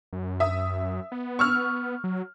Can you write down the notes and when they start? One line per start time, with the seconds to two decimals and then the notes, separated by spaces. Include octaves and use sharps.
0.13 F#2
0.40 E5 D#6
1.12 B3
1.39 C#6 E6 F6
2.04 F#3